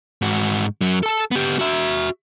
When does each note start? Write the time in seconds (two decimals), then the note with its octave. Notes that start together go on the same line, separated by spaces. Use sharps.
0.22 G#2 F#4
0.81 F#2 F#3
1.03 A4 A5
1.31 B3 G4
1.59 F#4 E5